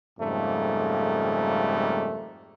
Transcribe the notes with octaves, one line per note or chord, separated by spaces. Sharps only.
F2 G#2 C#3 G3 A3 A#3